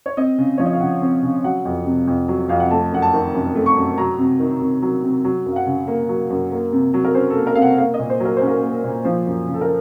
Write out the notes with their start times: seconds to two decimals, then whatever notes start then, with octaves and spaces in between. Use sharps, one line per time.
0.06 C#5
0.17 C4 D#5
0.38 C#3
0.58 F3 C#5
0.66 D#5
0.73 F5
0.81 C#3 F#5
1.02 C4
1.23 C#3
1.44 F#3 F#5
1.65 F2
1.86 C3
2.07 F2
2.28 F#3
2.49 F2 F5
2.60 F#5
2.71 A3 A5
2.92 F#2 F#5
3.02 A5
3.14 D#3
3.34 F#2
3.55 A3
3.66 C#6
3.77 F#2
3.98 F#3 A#5
4.19 C3
4.40 D#3
4.61 C3
4.82 F#3
5.03 C3
5.24 F#3
5.46 F#2
5.52 F5
5.56 F#5
5.67 C#3
5.88 A#3
6.09 F#3
6.30 F#2
6.52 A#3
6.72 C3
6.94 F#3
7.05 A#4
7.15 C#4 C5
7.30 A4
7.36 A#3
7.47 A#4
7.55 C3 F5
7.62 F#5
7.78 A#3 F5
7.94 D#5
7.99 A#2
8.10 C5
8.20 F#3
8.25 A#4
8.37 C#4 C5
8.47 A#4
8.62 A#3
8.84 A#2
9.05 F3 C5
9.26 F#2
9.47 C#3
9.54 A4
9.61 A#4